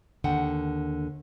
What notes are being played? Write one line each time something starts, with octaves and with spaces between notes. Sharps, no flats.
D#2 D3 F#5 G5